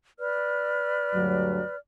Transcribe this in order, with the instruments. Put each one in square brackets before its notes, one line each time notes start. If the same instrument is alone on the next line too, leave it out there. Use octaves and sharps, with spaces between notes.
[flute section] B4 D5 F6
[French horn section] D2 G2 F#3